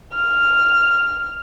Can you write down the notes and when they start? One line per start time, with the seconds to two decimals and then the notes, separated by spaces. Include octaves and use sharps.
0.13 F6